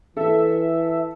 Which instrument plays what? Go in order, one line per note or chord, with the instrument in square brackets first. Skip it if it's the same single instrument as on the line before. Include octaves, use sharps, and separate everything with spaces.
[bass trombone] E3 [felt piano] A4 [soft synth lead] E5